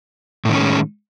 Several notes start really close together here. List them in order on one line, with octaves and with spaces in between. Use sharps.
A2 D#3 C#4 G#3